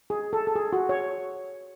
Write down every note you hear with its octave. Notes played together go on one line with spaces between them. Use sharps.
G#4
A4
A4
G#4
F#4
C#5